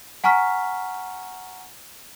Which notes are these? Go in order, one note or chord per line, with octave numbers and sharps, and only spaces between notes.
F#5 G#5 A#5 C#6 F6 B6